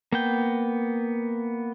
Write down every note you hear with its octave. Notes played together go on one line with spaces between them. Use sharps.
A#3 B3 G5